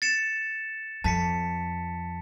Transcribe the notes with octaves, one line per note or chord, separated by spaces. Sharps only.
A6 C#7 E7
F2 A5 B6 C#7